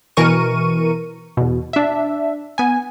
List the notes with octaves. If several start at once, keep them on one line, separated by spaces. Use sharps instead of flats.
B2 E3 A#4 C#6 D#7
E2 B2
D4 E5
B3 G#5